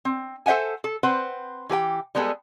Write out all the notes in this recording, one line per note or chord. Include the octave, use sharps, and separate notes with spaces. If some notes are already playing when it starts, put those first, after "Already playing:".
C4
A4 C5 E5 F#5 G#5
A4
C4 B4 C5 F#5
E3 G4 B4 G5
G3 G#3 B3 G#4 A4